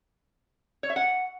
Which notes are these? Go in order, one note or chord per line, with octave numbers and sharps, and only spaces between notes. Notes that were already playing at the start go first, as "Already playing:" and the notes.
C#5
E5
F#5